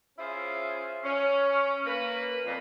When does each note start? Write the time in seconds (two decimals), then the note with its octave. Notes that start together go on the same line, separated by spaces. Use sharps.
0.18 C#4 E4 F4 G#4 C5
1.04 C#4
1.86 A#3 B4
2.46 F2 A#2